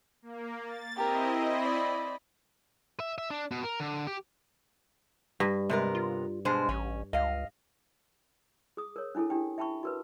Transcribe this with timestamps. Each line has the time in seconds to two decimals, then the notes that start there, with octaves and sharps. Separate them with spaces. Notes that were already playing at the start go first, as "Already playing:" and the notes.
0.22 A#3
0.65 A6
0.96 C4 E4 G4 A#4 D#5
1.60 D5 B5
3.00 E5
3.18 E5
3.30 D4
3.51 B2
3.64 A#4
3.80 D3
4.07 G4
5.40 G2
5.69 C3 G#3 B3 A#4
5.95 F4
6.45 B2 G#3 D4 C5
6.69 A1 C#4
7.13 C#2 D#5 F5
8.77 G#4 D#6
8.96 A#4 C#5
9.15 C#4 D4 E4 G#4 A4
9.30 D4 E4 G4 G5
9.58 E5 G5 A5 B5 C#6
9.83 F#4 A#4 B4